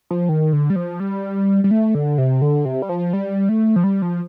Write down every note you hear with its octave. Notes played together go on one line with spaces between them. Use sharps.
F3
D#3
D3
G3
F3
G3
G3
A3
D3
C3
D3
C3
G3
F3
G3
A3
F3
G3
F3